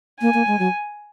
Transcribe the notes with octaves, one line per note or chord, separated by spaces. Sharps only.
A#3 G#5
A#3
G#3
F#3